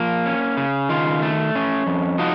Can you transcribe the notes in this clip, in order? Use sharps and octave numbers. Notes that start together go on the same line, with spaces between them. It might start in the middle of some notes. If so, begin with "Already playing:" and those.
Already playing: F3 A#3
C#4
C#3
D#3 F4
A3
C#4
F2
F3 D#4 F#4